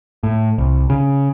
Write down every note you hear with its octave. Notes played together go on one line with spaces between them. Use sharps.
A2
C2
C#3